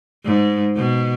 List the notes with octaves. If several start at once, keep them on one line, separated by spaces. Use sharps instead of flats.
G#2
B2